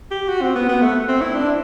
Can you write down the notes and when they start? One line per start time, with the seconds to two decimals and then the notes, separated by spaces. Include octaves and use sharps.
0.11 G4
0.29 F#4
0.42 C4
0.55 B3
0.69 B3
0.82 A3
1.08 C4
1.21 E4
1.34 D4